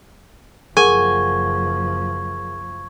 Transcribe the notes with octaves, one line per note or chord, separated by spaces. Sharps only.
F#1 F3 G#4 A#4 F#5 G#5 C#6 G#6